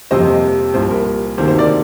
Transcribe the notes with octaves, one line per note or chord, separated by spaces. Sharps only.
F2 C3 G3 A#3 C5 D#5
C2 A#2 G3 C5
A#4
D2 C3 D#3 A#3 C5
C5
A#4 D5